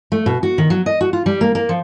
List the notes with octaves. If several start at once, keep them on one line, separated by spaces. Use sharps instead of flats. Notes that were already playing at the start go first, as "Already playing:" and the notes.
A3
B2
F#4
D#3
F#3
D#5
F#4
F4
G3
A#3
A#3
F3